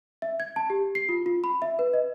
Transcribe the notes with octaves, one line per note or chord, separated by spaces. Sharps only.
E5
G#6
A5
G4
C7
F4
F4
B5
E5
B4
D#5